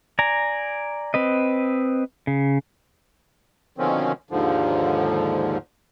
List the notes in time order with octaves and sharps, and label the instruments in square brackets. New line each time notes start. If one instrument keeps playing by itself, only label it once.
[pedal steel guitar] D5 G#5 A#5
C4 B4 D#5
C#3
[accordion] B2 D3 D#3 F3 C4 C#4
D#2 G#2 D3 F3